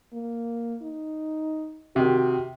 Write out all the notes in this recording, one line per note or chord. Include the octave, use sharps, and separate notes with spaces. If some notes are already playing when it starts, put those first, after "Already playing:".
A#3
D#4
C3 D#3 F#4